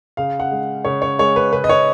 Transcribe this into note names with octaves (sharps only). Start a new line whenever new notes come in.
C#3 F5
F#5
G#3
C#3 C#5
C#5
G#3 C#5
B4
C#3 B4
D#5
C#5